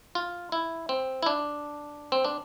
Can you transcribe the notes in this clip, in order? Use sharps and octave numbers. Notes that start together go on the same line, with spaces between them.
F4
E4
C4
E4
D4
C4
D4